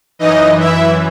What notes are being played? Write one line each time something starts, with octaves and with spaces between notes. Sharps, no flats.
F#2 E3 D#4 D#5
E4 E5